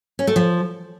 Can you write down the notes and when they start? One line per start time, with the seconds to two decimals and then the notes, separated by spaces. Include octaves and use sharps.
0.19 C#4
0.27 A3
0.36 F3